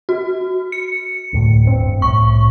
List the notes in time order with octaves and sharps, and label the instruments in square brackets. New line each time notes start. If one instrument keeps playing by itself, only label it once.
[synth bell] F#4
C#7
[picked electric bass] D2 A2
D#1 G2 C4
[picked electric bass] C2 A2 [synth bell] C#6